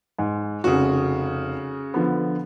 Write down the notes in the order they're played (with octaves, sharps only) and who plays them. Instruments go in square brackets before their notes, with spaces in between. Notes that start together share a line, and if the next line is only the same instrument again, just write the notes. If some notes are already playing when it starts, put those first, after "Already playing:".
[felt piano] G#2
[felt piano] F1 [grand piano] C#3 F#4
[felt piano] D3 F3 B3